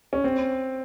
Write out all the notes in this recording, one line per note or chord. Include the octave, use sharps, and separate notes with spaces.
C#4
C4